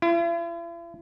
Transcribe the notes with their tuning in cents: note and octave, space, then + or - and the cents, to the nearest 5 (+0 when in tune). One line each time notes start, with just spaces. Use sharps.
E4 +45